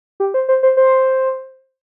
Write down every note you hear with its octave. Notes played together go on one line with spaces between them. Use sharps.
G4
C5
C5
C5
C5